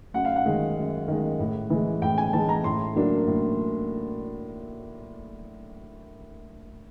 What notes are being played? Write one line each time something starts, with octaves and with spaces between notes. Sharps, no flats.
F#2 F#5
F5
F#5
D#3 G#3
F#2
D#3 G#3
A2
E3 G#3
A2 G5
G#5
E3 G#3 A5
A#5
A2 C6
F#3 A#3 D4
A2